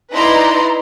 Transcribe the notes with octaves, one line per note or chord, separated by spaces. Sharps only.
D#4 E4 B4 D5 A#5 C6